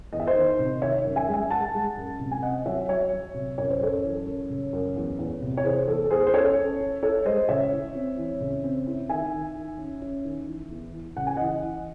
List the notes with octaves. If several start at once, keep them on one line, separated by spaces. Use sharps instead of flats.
E2 D#5
E5
C5 D#5
D#3
C3
D#3 C#5 E5
F#2
E5 G#5
G#3
E5 G#5
G#3 F#5 A5
G#3
F#2
C3
G#5
C4 D#5 F#5
F#3 C#5 E5
F#3 C#5 E5
F#3
C3
F#2 C#5
C5
F#2 A4 C#5
E3
F#2
C#3
F#2
E2
E2
C3
C#5
E3 G#4 C5
E2 A4
A4
E2 G#4 C5
C5
C#4 A4 C#5
C#4
C#4
E4 A4 C#5
G#3 C5 D#5
C#3 C#5 E5
E4
C4
E3
C#3
C4
E4
D#3 E5 G#5
D#3
D#3
C#4
C#4
D#3
E3
E2
E3
C#3 F#5
G#5
E3 D#5 F#5
E3